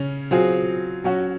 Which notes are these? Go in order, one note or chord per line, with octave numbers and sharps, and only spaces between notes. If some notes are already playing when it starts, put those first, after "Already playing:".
Already playing: C#3 C#4
F#3 C4 F4 G#4
F#3 C#4 F#4